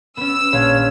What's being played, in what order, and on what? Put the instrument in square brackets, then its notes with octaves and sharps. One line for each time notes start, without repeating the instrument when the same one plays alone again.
[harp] B3 C#4 [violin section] E6
[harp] A#1 F5 [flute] C#5